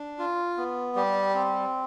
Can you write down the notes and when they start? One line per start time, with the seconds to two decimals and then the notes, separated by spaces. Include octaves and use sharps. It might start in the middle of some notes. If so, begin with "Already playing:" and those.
Already playing: D4
0.19 F4
0.57 B3
0.96 G3 G4
1.34 C4